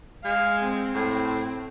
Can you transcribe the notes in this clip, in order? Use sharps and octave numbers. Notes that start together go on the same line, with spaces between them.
G#3 F5
C4
A2